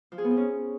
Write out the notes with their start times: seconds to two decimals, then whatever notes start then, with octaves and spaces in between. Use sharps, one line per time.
0.12 F3
0.18 G#4
0.24 B3
0.31 C4
0.37 C#4